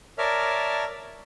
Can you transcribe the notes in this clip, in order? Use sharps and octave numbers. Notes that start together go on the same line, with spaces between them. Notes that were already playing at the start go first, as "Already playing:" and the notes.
A#4 C#5 D5 E5 A5 F6